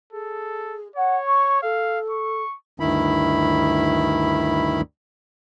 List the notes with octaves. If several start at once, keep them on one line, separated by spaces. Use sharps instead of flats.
G#4 A4
C#5 F#5
C#6
A4 F5
C#6
D2 G2 D#3 E4 B5